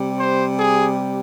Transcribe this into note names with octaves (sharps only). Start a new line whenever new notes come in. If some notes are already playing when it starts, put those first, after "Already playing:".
Already playing: C3 G3
C5
G#4